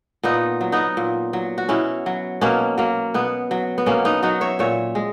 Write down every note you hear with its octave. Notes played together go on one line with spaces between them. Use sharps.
A#2 B3 D#4
F#3
B3 D#4
A#2
F#3
F#4
B2 C#4 E4
F#3
B2 A#3 C#4
F#3 A#3
B2 B3
F#3
B3
B2 A#3 C#4
B3 D#4
F#3 D#4 F#4
C#5 E5
A#2 C#5 E5
G#3